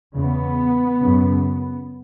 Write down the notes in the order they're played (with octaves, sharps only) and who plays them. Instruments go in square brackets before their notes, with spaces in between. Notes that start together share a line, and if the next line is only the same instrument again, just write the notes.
[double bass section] E2 C#3 B3
F#2 C#3